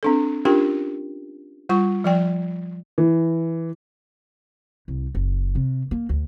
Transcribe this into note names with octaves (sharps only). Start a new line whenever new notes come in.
C4 D4 A4
C#4 D4 F4 G4 A#4 G5
G3 F4 C#6
F3 D5 G5
E3
C2
F#1
C3
A#3
D2